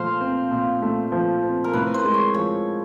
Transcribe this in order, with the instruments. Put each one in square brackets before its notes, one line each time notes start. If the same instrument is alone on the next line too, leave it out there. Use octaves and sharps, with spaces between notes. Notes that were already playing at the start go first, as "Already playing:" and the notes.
Already playing: [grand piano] A#2 F3 A3 [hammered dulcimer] C5 F5
[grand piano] C4
A#2
A3
F3
C4
[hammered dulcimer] A#4
[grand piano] A2 [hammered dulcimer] B4
[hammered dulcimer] C5
[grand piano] G#3
[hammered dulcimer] C#5
[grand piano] F3 [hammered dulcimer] C#5